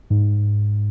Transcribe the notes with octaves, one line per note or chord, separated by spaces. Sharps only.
G#2